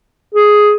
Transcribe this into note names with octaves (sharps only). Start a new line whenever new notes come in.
G#4